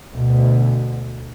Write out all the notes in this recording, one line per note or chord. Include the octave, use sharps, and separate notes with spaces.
D2 B2